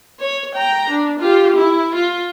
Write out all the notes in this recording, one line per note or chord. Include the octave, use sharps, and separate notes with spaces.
C#5
G5 A#5
D4
F4 G4
E4
F4